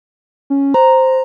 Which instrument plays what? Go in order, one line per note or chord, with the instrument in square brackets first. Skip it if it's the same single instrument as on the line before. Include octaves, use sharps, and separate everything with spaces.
[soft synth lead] C#4
[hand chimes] C5 [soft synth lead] A#5